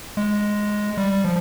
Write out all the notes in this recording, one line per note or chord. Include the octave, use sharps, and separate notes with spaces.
G#3
G3
F3